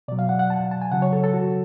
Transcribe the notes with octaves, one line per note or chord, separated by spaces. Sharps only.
B2 F#3 D5
F5
F#5
F#5
A5
A5
G#5
C#3 F#3 F#5
C#5
A4
A4
F#4